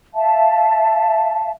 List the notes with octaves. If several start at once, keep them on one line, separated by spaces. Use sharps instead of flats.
E5 F5 A5